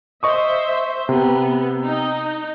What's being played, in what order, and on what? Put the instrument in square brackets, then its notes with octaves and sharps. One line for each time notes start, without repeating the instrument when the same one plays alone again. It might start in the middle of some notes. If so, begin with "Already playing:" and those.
[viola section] C5 E5 [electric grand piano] D#5 C#6 D#6
[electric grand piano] C3 [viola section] B3
[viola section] D#4